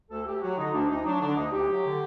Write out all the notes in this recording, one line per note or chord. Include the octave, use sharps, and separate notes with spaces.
D2 A4
D2 G4
F#3 F#4
D3 D#4
D2 D4
D2 D#4
F#3 D4
D3 D4
D2 D#4
D2 G4
F#3
D3